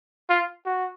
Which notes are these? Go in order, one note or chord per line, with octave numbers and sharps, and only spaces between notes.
F4
F#4